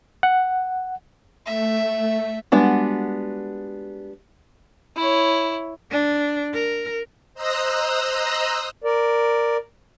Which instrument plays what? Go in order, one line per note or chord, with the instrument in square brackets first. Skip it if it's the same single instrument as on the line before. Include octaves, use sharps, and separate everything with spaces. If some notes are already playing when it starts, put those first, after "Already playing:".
[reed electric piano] F#5
[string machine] A3 [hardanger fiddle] E5
[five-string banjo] G3 G#3 B3 D4 F#4
[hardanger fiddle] E4 C#5
[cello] D4
A#4
[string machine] C5 D#5 A#5 D#6 E6 F#6
[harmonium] A#4 D5